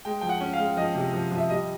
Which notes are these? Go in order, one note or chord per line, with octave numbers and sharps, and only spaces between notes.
G#3 G5
F3 G5
F#5
C#4
F5
G#3
F3 D#5
C3
F3
F3
E5
G3 D#5